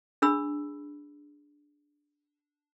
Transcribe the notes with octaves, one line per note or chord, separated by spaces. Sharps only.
D4 G#4 B5 E6